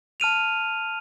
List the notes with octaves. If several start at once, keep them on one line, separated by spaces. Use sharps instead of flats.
A5 F6 D#7 F7